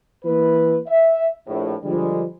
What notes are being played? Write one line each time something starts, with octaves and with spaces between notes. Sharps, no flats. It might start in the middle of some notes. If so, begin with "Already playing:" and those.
E3 A#3 B4
E5
A#1 A2
D3 F3 G3 G#3